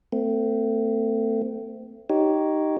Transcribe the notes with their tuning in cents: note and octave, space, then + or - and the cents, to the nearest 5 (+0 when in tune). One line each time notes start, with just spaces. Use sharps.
A3 +30 C4 -30
D#4 +0 G4 -15 C#5 +0